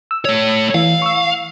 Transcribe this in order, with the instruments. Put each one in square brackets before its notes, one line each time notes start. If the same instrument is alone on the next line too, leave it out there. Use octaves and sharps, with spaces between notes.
[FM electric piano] E6
[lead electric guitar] A3 C#5
[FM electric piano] E3 [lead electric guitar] F5
[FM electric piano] C#6 E6